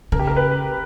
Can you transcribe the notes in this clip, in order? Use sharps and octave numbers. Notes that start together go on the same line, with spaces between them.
C#3 A#4
G4
A#4
B4